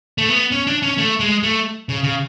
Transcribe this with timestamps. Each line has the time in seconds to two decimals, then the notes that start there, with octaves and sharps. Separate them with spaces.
0.18 A3
0.29 B3
0.52 C#4
0.67 D4
0.82 C#4
0.98 A3
1.20 G#3
1.43 A3
1.89 C#3
2.03 C#3